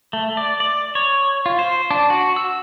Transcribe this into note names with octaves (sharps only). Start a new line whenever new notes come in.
A3
D5
D5
C#5
F4
C5
D4
F#4
E6